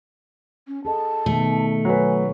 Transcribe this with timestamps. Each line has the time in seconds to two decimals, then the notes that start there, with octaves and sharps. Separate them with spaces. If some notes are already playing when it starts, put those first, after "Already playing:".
0.67 C#4
0.85 G#4 A4 D#5 A5
1.26 B2 D#3 A3 B3
1.85 F#3 B4 G#5